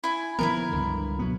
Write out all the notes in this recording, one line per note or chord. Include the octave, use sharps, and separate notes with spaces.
E4 G#5
D#3 F3 B3 E4 A4 A#4
C#2 G2 D3
B2 F#3 B3